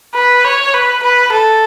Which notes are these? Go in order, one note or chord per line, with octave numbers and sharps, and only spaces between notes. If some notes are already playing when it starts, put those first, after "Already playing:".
B4
C#5
B4
B4
A4